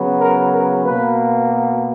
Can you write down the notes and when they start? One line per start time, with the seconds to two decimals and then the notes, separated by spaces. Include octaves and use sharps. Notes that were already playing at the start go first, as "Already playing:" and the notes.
Already playing: C#3 F#3 B3
0.21 A#4
0.53 A#4
0.85 B2 A#3 B4